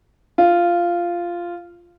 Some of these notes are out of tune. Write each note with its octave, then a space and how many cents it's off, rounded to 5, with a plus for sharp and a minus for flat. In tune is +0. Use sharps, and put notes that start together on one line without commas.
F4 -10